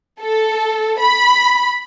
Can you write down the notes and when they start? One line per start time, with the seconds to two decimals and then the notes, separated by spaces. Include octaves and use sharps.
0.20 A4
1.00 B5